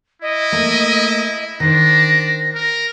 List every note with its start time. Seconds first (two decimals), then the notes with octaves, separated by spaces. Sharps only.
0.22 E4 D#5
0.52 A3 A#3
1.60 D#3 D4 C5 A#6
2.55 A#4